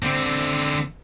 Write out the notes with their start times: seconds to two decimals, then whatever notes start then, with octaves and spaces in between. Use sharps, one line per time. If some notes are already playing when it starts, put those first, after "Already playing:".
0.03 D3 C4